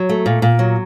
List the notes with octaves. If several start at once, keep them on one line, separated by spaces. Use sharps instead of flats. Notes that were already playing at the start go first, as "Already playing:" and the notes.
Already playing: F#3
A3
A#2
A#2
F#3